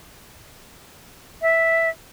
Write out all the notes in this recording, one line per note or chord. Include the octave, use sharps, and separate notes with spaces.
E5